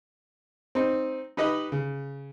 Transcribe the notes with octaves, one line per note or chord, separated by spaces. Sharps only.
C4 D#4
D#4 G4 B4 D#5
C#3